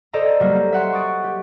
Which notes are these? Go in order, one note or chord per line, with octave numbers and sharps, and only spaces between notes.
A4 C5 D5 D#5 A#5
F#3 G3 A#3
A#3
E5 F#5 C6
C#6 D#6 A6 D7
G4